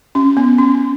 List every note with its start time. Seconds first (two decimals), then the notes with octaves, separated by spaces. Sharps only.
0.15 C#4
0.37 B3
0.58 C#4